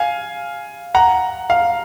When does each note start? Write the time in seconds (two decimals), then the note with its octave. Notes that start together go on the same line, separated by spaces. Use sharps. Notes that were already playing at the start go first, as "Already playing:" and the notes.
Already playing: F5 G#5
0.95 F#5 A#5
1.50 F5